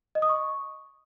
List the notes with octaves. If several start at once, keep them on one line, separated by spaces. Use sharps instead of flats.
D#5
D#6
C#6